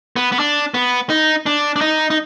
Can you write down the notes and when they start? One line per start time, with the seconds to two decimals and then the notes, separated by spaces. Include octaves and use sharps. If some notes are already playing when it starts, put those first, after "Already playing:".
0.16 B3
0.32 B3
0.39 D4
0.74 B3
1.10 D#4
1.46 D4
1.76 D4
1.81 D#4
2.10 D#4